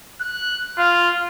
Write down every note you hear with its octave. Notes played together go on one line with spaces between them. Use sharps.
F#6
F4